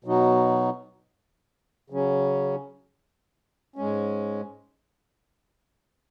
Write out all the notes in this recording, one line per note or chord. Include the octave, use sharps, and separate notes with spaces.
B2 F#3 D#4 F#4
C#3 F#3 C#4
G#2 G#3 C#4